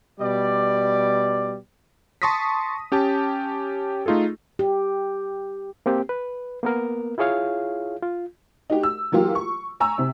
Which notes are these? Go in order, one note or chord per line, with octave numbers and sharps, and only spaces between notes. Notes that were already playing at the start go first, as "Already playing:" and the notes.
B2 G3 D5
A5 C6 C#6 D#6 A#6 B6
C#4 G4 G5 A5
A3 D#4 F4 G#4 A4
G4
A#3 C4 G4
B4
A#3 B3 A#4
E4 F4 G#4 C#5 F5
F4
D#4 F#4 G4
E6
E3 F#3 A#3 F4 G4
C#6
G#5 A#5 C#6 E6
C3